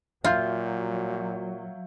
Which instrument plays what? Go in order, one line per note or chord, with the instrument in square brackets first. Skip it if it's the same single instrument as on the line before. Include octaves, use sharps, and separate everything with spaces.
[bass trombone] A#2 [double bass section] F#3 [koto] F4 [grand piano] E5 F5 G6